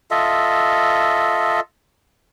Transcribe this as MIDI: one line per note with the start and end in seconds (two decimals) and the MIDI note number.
0.11 1.60 65
0.11 1.60 69
0.11 1.60 75
0.11 1.60 76